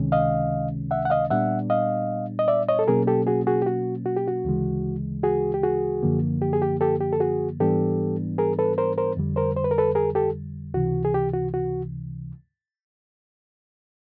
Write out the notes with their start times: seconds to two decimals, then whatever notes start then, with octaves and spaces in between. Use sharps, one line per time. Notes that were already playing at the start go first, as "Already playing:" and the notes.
Already playing: C#2 C3 D#3 G#3 C#4
0.12 D#5 F5
0.91 E5 F#5
1.05 F#5
1.10 D#5 F5
1.30 A#2 G3 B3 D4 E5 F#5
1.70 D#5 F5
2.39 D#5
2.48 D5 E5
2.68 C#5 D#5
2.79 A4
2.88 B2 F#3 A#3 C#4 G#4 A#4
3.07 G4 A4
3.27 F#4 G#4
3.47 F#4 G#4
3.62 G4
3.66 F#4
4.06 F#4
4.16 G4
4.28 F#4
4.45 D2 C#3 E3 G#3
5.23 F#4 G#4
5.54 G4
5.63 F#4 G#4
6.03 F#2 D3 F3 A#3
6.42 G4
6.53 G#4
6.62 G4
6.81 G4 A4
7.01 G4
7.13 A4
7.20 F#4 G#4
7.60 G#2 E3 G3 B3 D4 G4 A4
8.38 G#4 A#4
8.59 A4 B4
8.78 A#4 C5
8.98 A#4 C5
9.17 F2 D3 G3
9.36 A#4 C5
9.57 C5
9.64 B4
9.71 A#4
9.78 A4 B4
9.95 G#4 A#4
10.15 G4 A4
10.74 C#2 C3 E3 F#4
11.05 G#4
11.14 G4
11.34 F#4
11.54 F#4